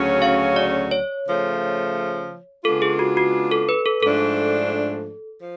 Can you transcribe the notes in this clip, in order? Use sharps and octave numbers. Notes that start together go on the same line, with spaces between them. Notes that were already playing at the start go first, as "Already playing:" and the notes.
Already playing: D2 C#3 F#3 C#4
F5
D5
C#5
C#3 F3 A3
C#3 G#3 B3 D4 F4 A4
G#4
F#4
F#4
A4
B4
A4
G#2 F3 A3 D4 A4
F3